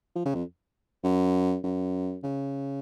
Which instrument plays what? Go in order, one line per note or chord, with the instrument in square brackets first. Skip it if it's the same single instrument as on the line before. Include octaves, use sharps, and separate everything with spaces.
[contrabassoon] F3
C#3
F2
F#2
F#2
C#3